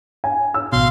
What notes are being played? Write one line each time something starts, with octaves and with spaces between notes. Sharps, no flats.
G#5
E6
A1 B2 F5 C6